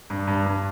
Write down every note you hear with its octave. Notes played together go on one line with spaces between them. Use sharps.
G2
G2
G2